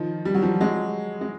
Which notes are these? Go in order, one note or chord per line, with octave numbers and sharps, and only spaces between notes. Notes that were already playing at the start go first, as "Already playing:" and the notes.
Already playing: D#3 F3
G3
F#3
F3 G3
F#3 G#3
G#3